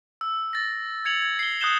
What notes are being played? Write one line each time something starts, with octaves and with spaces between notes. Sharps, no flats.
E6
A6 A#6
G#6 C#7 F7 F#7
G#6
C7 G7
D#6 F#6 G6 C7 E7 G7